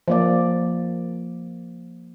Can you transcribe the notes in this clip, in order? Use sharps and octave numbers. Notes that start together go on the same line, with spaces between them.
F3 A#3 D5